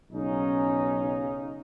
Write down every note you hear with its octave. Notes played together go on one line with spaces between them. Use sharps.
B1 C#3 C#4 D#4